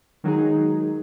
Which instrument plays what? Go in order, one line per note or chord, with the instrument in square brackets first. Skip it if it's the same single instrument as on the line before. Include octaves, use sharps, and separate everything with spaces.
[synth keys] D#3 F#3 G#3 D#4 G#4